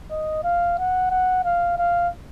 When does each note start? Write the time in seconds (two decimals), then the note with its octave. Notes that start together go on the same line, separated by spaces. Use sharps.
0.10 D#5
0.44 F5
0.79 F#5
1.11 F#5
1.44 F5
1.78 F5